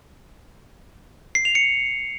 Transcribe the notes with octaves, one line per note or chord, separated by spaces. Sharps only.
C7
F7
C#7